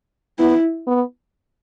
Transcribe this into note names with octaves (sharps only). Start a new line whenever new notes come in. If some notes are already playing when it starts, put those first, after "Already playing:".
B3 E4
B3